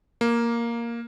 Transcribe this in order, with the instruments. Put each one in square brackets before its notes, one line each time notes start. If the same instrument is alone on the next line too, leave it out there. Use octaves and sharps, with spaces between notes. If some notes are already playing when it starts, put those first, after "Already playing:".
[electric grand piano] A#3